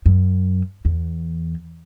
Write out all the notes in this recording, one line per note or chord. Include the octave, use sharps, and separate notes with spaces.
F#2
E2